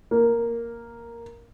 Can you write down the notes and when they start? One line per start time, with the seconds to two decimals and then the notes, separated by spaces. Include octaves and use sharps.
0.11 A#3